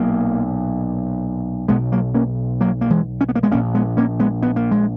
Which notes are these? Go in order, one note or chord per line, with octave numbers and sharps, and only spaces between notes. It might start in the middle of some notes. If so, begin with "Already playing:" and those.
Already playing: B1 A#2 F#3 A#3
B1 B2 G#3 B3
F#3 A#3
A#3 C#4
F#3 A#3
A#3
E3 G#3
C#4
B3
A#3
G#3 B3
A#1 A#2 A#3 C#4
G#3 B3
A#3 C#4
G#3 B3
B3
A#3
G#3